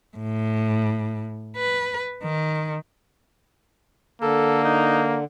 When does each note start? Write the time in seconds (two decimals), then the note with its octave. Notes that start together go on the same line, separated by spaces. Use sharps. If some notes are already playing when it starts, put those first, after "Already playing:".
0.17 A2
1.56 B4
2.23 D#3
4.22 D3 A#3 A4
4.64 D#4